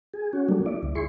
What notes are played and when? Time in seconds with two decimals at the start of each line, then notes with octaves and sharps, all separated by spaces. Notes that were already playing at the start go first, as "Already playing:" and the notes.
0.14 G#4
0.33 C#4 F#4
0.49 F#3 G3 A3 A#3 D4
0.66 E4 D5
0.83 D2
0.95 E4 G#4 C6 C#6